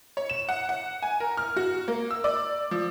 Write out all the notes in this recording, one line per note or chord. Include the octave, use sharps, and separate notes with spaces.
C#5
E7
F#5
F#5
G#5
A#4
F6
F#4
A#3
E6
D5
F3